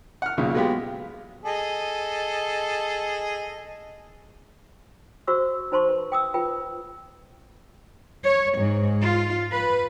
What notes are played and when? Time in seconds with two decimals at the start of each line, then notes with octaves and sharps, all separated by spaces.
0.22 F#5 F6
0.37 B1 A#2 C#3
0.54 F#3 G#3 B3 F4 G4
1.45 G#4 A4 D#5
5.27 F#4 C5 C#6 E6
5.72 D#4 C5 A5 C6 C#6
5.89 B4
6.12 G5 D#6 E6
6.34 F4 B4 G5
8.24 C#5
8.58 G#2
9.02 F4
9.52 B4